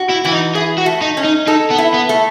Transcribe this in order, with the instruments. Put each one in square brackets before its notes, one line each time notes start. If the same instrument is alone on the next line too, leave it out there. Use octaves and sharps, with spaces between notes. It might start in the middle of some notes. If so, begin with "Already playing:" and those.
Already playing: [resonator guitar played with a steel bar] F#4
[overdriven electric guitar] E4
[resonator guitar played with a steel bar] E3 [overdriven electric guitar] E4
[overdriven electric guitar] D#4
[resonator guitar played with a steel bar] E4 [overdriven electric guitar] G#4
[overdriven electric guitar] F#4
[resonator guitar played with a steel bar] A3
[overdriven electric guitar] D#4
[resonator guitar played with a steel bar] C#4
[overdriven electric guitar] D#4
[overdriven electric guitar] D#4 [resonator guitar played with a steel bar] A4
[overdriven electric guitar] B3
[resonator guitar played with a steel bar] E4
[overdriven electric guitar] B3
[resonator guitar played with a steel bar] A3